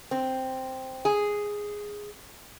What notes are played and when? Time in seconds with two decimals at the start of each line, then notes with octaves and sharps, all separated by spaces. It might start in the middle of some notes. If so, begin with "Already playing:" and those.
0.11 C4
1.05 G#4